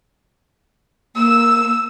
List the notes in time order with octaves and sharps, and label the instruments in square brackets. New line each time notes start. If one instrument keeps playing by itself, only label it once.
[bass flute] A#3 [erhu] E6